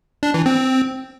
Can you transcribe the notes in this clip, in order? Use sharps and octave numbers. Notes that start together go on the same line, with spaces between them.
D4
E3
C4